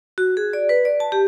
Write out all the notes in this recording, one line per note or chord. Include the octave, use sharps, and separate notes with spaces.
F#4
G#4
D5
B4
D5
A5
G4